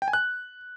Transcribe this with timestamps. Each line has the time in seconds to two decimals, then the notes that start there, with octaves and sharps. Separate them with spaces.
0.02 G5
0.08 G#5
0.13 F#6